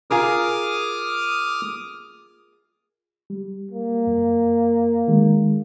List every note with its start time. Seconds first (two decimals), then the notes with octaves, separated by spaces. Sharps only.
0.11 F4 G#4 A#4 D6 D#6 F6
3.30 G3
3.71 A#3
4.07 F#2
5.08 D#3 G#3